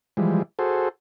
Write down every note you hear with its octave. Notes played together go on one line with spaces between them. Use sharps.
E3 F3 G3 G#3
F#4 G#4 A4 C5